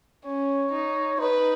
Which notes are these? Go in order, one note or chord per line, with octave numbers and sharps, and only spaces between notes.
C#4 C#5
D#4
D#4 B4